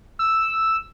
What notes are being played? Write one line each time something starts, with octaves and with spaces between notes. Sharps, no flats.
E6